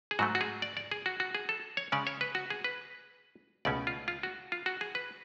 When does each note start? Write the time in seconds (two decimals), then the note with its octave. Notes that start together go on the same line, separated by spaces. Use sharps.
0.11 G#4
0.19 G#2 F#3 A3 F#4
0.35 F#4
0.41 G#4
0.62 D5
0.77 D5
0.91 G#4
1.06 F#4
1.20 F#4
1.35 G#4
1.49 A4
1.77 C#5
1.92 C#3 G#3 C#4 D5
2.07 C#5
2.21 B4
2.35 F#4
2.50 G#4
2.64 B4
3.65 C#2 B2 A3 C#4 D5
3.87 F4
4.08 F4
4.23 F#4
4.52 F4
4.66 F#4
4.81 G#4
4.95 B4